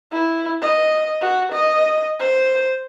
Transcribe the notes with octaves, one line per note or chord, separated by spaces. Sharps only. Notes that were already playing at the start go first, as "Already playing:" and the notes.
E4
D#5
F#4
D#5
C5